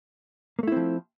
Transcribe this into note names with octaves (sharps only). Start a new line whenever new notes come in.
F3 A3 A#3 C4 E4